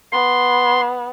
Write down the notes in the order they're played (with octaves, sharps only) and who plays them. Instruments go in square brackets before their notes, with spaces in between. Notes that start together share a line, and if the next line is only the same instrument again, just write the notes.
[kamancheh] B3 [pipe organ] C6